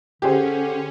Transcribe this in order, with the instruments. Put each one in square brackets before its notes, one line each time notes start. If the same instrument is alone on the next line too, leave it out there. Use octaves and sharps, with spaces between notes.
[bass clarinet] D3 [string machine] C#4 [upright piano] G4 G#4 C5